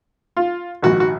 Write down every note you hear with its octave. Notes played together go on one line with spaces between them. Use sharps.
F4
A#1 G#2 D#3 F#4
F#4